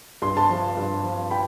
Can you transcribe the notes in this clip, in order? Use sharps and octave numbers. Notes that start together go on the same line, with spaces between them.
G2 C6
A5 C6
F3
G2
F3
G5 B5